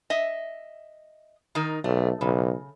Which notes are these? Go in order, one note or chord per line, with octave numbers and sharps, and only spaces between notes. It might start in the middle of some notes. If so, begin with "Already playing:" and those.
D#5 E5
D#3 D#4 A#4
B1 A3
B1 C#3